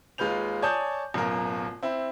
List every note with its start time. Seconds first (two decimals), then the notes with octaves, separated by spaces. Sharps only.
0.18 D#2 G#3 F4 B4 G6 F7
0.62 C#5 D5 G#5 A5 D#6 G6
1.14 D1 F#2 B2 F4 A#4
1.83 C4 E4